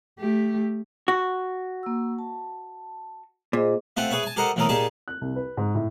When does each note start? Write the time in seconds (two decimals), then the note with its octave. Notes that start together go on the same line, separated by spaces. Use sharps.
0.20 A3 G4
1.08 F#4
1.83 A#3 E6
2.19 A5
3.53 A#2 G#4 C5 D#5
3.97 A3 C4 F4 G4 C5 F#5
4.11 G#4 B4 C#5 E5
4.23 G#5 A5
4.36 G4 A4 A#4 C5 D#5 F#5
4.56 E2 A2 E3 A3 A#4 D#6
4.69 A#2 D#4 G4 G#4 A5
5.08 F#6
5.21 C2
5.36 B4
5.57 G#2
5.75 A2